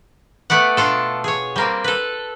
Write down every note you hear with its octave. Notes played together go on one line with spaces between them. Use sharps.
A3 B3 D5 F#5
B2 D4 F4 A4
G#4 C#5
G3 A#3 C4
A4 B4